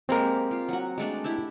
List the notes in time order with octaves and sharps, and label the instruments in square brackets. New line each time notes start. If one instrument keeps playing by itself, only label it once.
[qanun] G#3 A#3 G4 [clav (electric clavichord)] C4 A#4
[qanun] F4 G4
F#3 F#4
G#3 A3 D4
E4 G4 E5